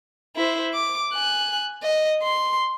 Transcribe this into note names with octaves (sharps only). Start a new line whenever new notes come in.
E4 C5
D6
G#5 F#6
D#5
C6